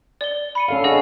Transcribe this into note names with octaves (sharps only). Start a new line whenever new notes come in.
D5 G7
B5 C#7 D#7
C#4 A4 F5
D4 G#4 D#5 F#5